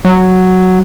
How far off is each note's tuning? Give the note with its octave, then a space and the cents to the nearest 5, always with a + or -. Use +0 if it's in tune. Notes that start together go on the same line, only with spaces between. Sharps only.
F#3 +0